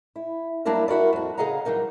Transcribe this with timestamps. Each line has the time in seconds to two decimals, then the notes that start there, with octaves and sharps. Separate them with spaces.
0.16 E4
0.65 F#3 G3 A#3 D4 E4 A#4
0.88 E4 F#4 A#4 D5
1.13 F2 F#4
1.38 C#3 G#4 D#5 F5 F#5 A#5
1.65 E3 F#3 G3 D#4 A#4